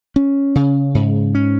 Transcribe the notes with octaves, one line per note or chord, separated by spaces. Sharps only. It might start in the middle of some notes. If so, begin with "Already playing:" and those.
C#4
C#3
G#2
C#4